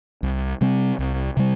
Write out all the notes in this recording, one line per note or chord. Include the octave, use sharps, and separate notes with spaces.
C2
C3 G3 C4
C2
C3 G3